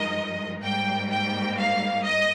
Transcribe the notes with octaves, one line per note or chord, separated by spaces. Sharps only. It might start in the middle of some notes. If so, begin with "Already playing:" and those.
Already playing: G2 F3 G#3 D#4 A#4 D#5
G#2 G3 A#3 G5
G5
F5
D#5